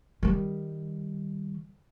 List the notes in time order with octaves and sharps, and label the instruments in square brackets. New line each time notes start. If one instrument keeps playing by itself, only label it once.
[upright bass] D#3 G3